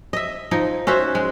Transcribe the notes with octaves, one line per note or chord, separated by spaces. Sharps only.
D#5 E5
F3 D#4
C#4 F#4 C5 E5
G#3